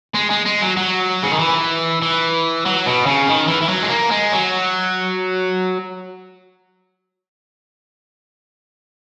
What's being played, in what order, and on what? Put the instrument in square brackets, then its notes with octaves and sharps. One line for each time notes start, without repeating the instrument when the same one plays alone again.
[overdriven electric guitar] G#3
G#3
G#3
F#3
F#3
C#3
D#3
E3
E3
F#3
B2
C#3
D#3
E3
E3
F#3
G#3
A#3
G#3
F#3